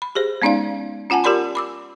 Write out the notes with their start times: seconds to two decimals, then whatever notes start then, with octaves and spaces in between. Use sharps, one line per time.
0.02 B5
0.15 G4 G#4 C5
0.42 G#3 B3 C#4 D#4 D5 F5
1.10 C#4 F4 F#5 G#5 A5
1.24 F4 G4 A#4 D5 B5 C6
1.55 B5 D6 E6